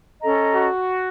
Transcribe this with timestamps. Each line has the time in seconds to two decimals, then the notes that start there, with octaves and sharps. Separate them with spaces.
0.21 C#4 A4 D#5 A#5
0.54 F#4